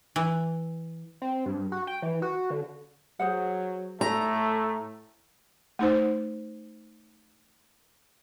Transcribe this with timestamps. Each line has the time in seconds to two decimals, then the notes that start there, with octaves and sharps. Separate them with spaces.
0.16 E3
1.22 C4
1.46 G2
1.72 F#4
1.87 G5
2.02 E3
2.22 F#4
2.50 D3
3.20 F#3 G#4 C5 F#5
4.01 A2 A3 A#5
5.79 A3 D#4 C5